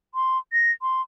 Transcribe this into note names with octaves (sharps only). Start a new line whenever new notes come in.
C6
A#6
C6